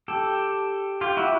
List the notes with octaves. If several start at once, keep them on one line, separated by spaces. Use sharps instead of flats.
G4 A4
F4 G4
E4 F#4